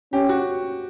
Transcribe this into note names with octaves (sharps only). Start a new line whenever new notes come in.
C#4 G4
F#4